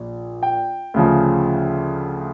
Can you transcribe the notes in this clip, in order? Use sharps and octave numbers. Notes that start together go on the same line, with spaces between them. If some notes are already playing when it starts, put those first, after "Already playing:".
Already playing: A#1 A#2
G5
D2 C#3 F3